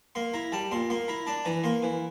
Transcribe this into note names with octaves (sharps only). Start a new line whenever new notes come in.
A#3 C6
E4 A#5
G3 A5
A#2 C6
A#3 C6
E4 A#5
D4 A5
E3 A#5
A#3 C6
E3